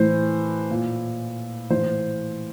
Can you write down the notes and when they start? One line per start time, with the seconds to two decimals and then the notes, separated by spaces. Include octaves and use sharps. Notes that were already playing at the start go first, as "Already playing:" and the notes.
Already playing: A2 E3 C5
0.70 A#2
1.70 A2 E3 C5